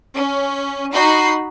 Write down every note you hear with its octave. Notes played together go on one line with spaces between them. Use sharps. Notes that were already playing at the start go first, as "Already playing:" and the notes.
C#4
D#4 F#4 B5 G6 C7